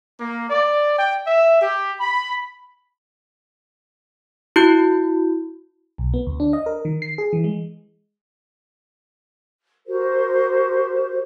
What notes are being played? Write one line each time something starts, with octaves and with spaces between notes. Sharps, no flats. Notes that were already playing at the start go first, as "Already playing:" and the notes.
A#3
D5
G5
E5
G4
B5
E4 F#4 G6
B1
B3
D2
D4
D#5
A#4
D#3
C7
G#4
E3
G#3
F#4 G4 A#4 C5